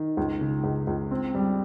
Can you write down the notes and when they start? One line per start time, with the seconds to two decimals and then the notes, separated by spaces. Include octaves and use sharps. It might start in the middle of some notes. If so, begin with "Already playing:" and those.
Already playing: D#3
0.17 C#2
0.41 C#3
0.64 C#2
0.87 C#2
1.11 C4
1.35 G3